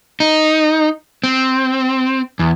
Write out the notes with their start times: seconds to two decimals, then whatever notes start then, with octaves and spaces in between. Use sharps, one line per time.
0.20 D#4
1.24 C4
2.39 E2